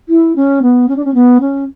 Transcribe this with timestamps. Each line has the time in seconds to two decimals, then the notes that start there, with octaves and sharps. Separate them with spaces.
0.09 E4
0.36 C#4
0.62 B3
0.88 C#4
0.96 D4
1.04 C#4
1.14 B3
1.40 C#4